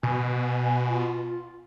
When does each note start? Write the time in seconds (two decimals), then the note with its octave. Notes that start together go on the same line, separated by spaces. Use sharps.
0.03 B2 G#5
0.89 F4